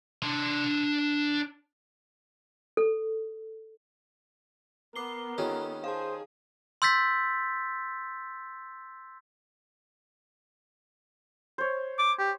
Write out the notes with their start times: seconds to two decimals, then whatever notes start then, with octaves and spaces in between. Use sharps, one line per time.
0.23 D4 C6
2.77 A4
4.96 B3 A#4 D6 C7 G7
5.38 D#3 C#4 F4 G4 A4
5.84 G#4 C5 F5 A5
6.82 C6 E6 G6 A6 B6
11.58 C5 C#5
11.99 D6
12.19 G4